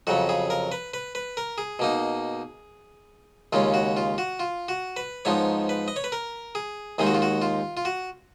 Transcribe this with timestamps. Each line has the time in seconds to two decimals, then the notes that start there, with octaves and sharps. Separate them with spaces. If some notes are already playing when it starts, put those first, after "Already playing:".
0.07 F2 C#3 F#3 F#4
0.29 G#4
0.50 A#4
0.72 B4
0.94 B4
1.15 B4
1.37 A#4
1.58 G#4
1.79 B2 A#3 D#4
3.53 D#2 C#3 G#3 C#4 F4
3.74 F#4
3.97 F4
4.18 F#4
4.40 F4
4.68 F#4
4.97 B4
5.25 G#2 F3 B3 D#4 C#5
5.69 B4
5.88 D#5
5.96 C#5
6.04 B4
6.12 A#4
6.55 G#4
6.98 D#2 D#3 G#3 D#4 G#4
7.07 F#4
7.14 F4
7.22 F#4
7.42 F4
7.77 F4
7.85 F#4